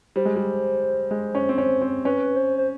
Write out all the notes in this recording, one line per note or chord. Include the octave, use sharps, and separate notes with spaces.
G3 C5
G#3
G3
G#3
C#4
C4
C#4
C4
C#4 B4
C5
C5